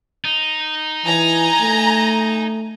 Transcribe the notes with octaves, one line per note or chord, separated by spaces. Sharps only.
D#4
E3 G#5 A#5
A3